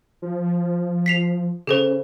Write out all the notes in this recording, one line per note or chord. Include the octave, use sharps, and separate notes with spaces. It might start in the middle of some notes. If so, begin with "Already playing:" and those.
F3
B6 C7 F7
C#3 G#4 A4 C5